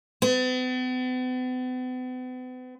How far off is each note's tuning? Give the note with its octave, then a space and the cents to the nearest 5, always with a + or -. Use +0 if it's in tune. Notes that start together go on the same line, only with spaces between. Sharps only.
B3 +45